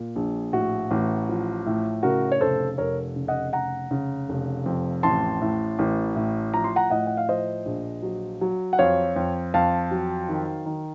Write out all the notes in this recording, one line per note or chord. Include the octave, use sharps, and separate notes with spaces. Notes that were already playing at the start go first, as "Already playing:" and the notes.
Already playing: A#2
A#1
A2 F#4
A1
F3
A2
C#3 F#4 A#4
C#5
F1 A4 C5
F1 A#4 C#5
C#3
D#5 F#5
F1 F#5 A#5
C#3
F1
F2
A1 A5 C6
A2
A1
A2
F3 A#5
C6
F#5 A#5
A2 D#5 F#5
F#5
F5
F3 C5 D#5
A#1
F#3
F#3
F#5
F2 C#5 F5
F2
F2 F5 A5
F#3
D#3
D#3